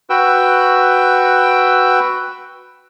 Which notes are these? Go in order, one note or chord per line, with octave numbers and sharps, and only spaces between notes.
F#4 B4 G5 E6